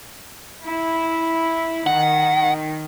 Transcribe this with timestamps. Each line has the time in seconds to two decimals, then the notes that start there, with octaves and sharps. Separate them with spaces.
0.64 E4
1.87 D#3 F#5